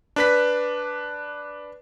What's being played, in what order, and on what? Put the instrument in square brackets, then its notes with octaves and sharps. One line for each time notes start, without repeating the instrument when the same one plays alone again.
[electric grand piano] D4 B4 B6